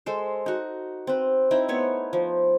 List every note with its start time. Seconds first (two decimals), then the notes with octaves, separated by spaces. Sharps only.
0.06 G#3 A4 C5
0.46 D#4 F#4
1.07 C4 B4
1.51 C4 D#4 E4
1.68 A3 B3 C#5
2.13 F3